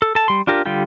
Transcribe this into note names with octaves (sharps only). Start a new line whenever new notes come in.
A4
A4 A5
G3 C6
D4 F4 G4 A#4
D3 G3 F4 G4